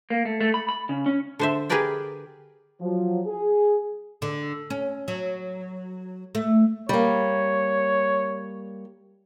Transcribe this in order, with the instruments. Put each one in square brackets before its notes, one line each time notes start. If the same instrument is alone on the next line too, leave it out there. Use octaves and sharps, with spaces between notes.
[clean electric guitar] A#3
A3
A3
B5
B5
C#3
C#4
[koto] D3 C5 E5
G4 G#4 A#4 B4 D5 G5
[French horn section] F3 F#3
G#4
[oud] D3
C#4
F#3
A3
[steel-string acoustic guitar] G3 A#3 [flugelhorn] C#5